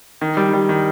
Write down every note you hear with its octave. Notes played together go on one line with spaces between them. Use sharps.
D#3
G3
G3
D#3